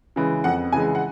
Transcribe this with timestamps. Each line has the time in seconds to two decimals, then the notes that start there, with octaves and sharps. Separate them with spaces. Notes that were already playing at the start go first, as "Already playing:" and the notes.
0.16 C#3 E3 G#3
0.44 F2 F#5
0.72 C#3 E3 G#3 G#5
0.95 F#5